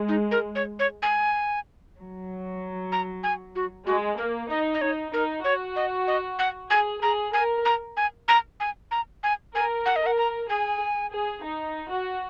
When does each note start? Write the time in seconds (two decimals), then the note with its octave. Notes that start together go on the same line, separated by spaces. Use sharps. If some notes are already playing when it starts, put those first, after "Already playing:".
Already playing: G#3
0.08 D#4
0.31 A#4
0.55 C#5
0.79 C#5
1.02 G#5
1.97 F#3
2.92 A#5
3.23 G#5
3.55 F#4
3.86 G#3 F#4
4.18 A#3 A#4
4.49 D#4 D#5
4.74 D#5
4.81 D#4 C#5
5.12 D#4 A#4
5.44 F#4 C#5
5.76 D#5
6.07 D#5
6.39 F#5
6.70 G#4 G#5
7.02 G#4 A#5
7.34 A#4 G#5
7.65 A#5
7.97 G#5
8.28 A#5
8.60 G#5
8.91 A#5
9.23 G#5
9.55 A#4 G#5
9.86 F#5
9.96 D#5
10.02 A#4 F#5
10.18 A#5
10.49 G#4 G#5
11.12 G#4
11.44 D#4
11.91 F#4